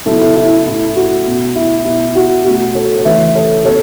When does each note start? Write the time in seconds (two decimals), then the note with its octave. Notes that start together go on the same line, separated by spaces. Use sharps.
0.06 C#3 F#3 B3 E4 A4
0.21 E4
0.36 E4
0.66 A2 A3 C#4 E4
0.96 F#4
1.26 B2 B3
1.56 E4
1.85 B2 B3 E4
2.16 F#4
2.45 B2 A3 C#4 F#4
2.75 A4 C#5
2.98 C#5
3.05 C#3 E3 A3 C#4 B4 E5
3.35 A4 C#5
3.65 B2 B3 A4 C#5